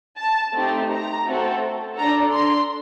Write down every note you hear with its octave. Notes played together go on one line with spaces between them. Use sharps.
A5
A3 C4 D#4 G4
A#5
A3 C4 F#4 A4
D4 A4 A#5
C6